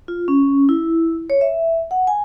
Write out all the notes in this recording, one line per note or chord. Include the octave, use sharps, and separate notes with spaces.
F4
C#4
E4
C#5
E5
F#5
G#5